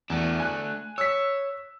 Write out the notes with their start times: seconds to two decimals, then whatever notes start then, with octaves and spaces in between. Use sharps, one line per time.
0.10 E2 A3 D4
0.40 G#5 F#6
0.98 C#5 E6 B6